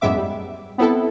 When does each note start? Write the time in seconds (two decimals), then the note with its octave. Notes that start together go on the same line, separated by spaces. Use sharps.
0.01 F#2 A2 G#3 B3 E5 D6
0.17 G3
0.78 B3 C4 E4 A4